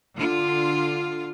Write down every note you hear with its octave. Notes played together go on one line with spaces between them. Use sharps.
D3 F4